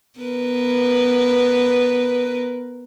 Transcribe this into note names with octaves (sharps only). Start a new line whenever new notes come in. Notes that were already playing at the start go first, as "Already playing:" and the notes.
B3 A#4 B4